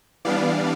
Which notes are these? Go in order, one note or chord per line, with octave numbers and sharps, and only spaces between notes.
E3 G3 B3 D4 D5 F5